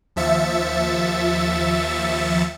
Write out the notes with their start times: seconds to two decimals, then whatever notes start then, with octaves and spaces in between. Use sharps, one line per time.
0.16 D#2 F3 E5 A6 C#7